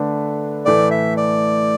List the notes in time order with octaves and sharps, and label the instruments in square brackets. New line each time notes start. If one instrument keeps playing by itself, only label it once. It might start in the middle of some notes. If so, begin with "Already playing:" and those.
Already playing: [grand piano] D3 A3 D4 B4
[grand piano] A2 E3 A3 [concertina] D5
[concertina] E5
D5